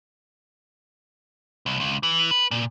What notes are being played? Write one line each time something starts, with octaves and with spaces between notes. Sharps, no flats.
C2
C#2
E3
B4
A#2